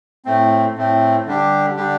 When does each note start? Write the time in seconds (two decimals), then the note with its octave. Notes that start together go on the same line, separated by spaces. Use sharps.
0.25 A2 A3 C4
0.76 A2 A3 C4
1.26 D3 G3 D4 G4
1.76 D3 G3 D4 G4